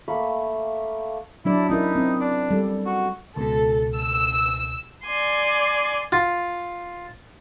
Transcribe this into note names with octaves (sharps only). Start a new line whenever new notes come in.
A3 A#3 B5 C#6
F#3 D4 E4 D5
C#4 D#4 E4 A#4
C4
D4
G3 A4
F#4
C#2 B2 A4
E6
D5 G#5 C6
F4